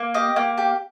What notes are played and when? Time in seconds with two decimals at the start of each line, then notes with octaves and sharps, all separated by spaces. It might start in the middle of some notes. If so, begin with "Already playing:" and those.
Already playing: A#3
0.14 G4 D#5
0.36 A#3
0.58 G4